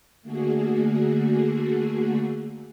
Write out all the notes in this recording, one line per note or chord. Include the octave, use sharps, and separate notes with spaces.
D3 A3 A#3 F#4 G#4